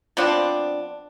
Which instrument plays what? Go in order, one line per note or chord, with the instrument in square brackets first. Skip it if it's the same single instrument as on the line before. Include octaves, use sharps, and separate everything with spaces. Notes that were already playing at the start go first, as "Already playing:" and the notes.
[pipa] F3 B3 C4 D4